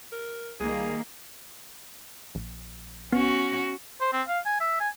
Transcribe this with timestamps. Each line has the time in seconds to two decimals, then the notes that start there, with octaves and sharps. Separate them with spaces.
0.13 A#4
0.60 C2 D#3 G3 A#3 G#4
2.35 A#1
3.12 B3 C#4 F#4
4.01 C5
4.13 C4
4.28 F5
4.46 G#5
4.60 E5
4.80 G#5